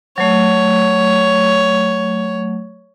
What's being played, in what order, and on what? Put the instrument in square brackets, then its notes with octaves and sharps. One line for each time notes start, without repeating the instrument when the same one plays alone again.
[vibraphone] F#3 A3 [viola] C#5